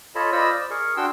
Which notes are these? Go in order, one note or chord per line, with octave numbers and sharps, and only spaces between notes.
F4 A4 C#5 D#5 A5 B5
F4 C5 D5 D#5 B5 E6
D5
G#4 A#4 C#6
D4 F#4 G5 C6 E6